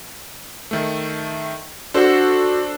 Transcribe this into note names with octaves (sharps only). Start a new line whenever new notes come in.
D#3 A3
D4 F#4 A4 C5